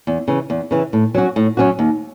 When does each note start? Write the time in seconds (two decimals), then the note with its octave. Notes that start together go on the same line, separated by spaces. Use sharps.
0.07 E2
0.28 C#3 E3
0.50 E2
0.71 C#3 E3
0.93 A2
1.15 F#3 C#4 F#4
1.36 A2
1.57 F#3 C#4 F#4
1.79 D#2